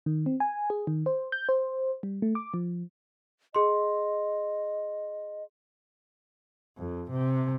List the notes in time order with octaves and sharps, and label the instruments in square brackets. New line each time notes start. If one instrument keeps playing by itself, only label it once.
[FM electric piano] D#3
C4
G#5
G#4
D#3
C5
G6
C5
G3
A3
D6
F3
[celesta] G#4 C6 [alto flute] D#5
[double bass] F2
C3